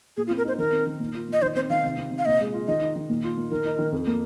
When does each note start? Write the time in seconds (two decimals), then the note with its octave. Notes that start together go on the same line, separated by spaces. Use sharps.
0.17 A#2 G#4
0.27 F4
0.31 C4
0.38 A#4
0.44 D#4 C5
0.58 D#3 A#4
0.72 C4
0.86 D#3
1.00 A#2
1.14 F4
1.28 A#2 D#5
1.42 D#3 C5
1.56 C4 C5
1.70 D#3 F5
1.84 C3
1.97 C4
2.11 C3
2.18 F5
2.25 A#2 D#5
2.40 G#3
2.53 F4
2.67 D#3 D#5
2.81 D#4
2.96 D#3
3.09 A#2
3.24 F4
3.37 A#2
3.51 D#3 A#4
3.65 D#4
3.79 D#3
3.93 F2
4.07 A#3